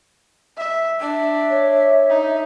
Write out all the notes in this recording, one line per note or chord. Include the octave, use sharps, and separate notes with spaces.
E5
D4 E5
C#5
D#4